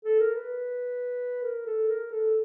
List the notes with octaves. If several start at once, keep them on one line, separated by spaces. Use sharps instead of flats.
A4
A#4
B4
A#4
A4
A#4
A4